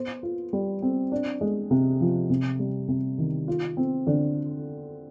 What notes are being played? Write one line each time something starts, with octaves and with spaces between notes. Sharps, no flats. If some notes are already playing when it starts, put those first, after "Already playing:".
Already playing: B3 C5
F4
G3
C4
D4
G#3
C3
F3
C3
G3
C3
D#3
F4
C4
D3